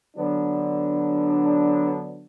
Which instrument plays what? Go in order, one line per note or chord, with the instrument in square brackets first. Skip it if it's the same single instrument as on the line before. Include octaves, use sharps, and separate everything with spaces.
[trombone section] D3 F#3 B3 D4